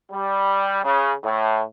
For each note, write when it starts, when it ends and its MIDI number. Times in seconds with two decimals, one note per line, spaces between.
0.11 0.81 55
0.84 1.12 49
1.24 1.61 45